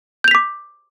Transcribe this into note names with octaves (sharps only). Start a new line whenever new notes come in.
D6 G6 B6 F7